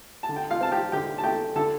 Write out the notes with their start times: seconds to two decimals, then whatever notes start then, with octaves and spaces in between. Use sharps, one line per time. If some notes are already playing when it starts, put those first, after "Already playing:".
0.23 A5
0.29 D3
0.36 G5
0.50 F4 F5
0.61 C4 A5
0.72 G4 G5
0.92 D3 G4 G5
1.18 A5
1.24 A3 G4 G5
1.56 D3 A4 A5